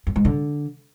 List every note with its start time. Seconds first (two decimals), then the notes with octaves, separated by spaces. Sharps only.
0.07 F#2
0.16 G#2
0.25 D3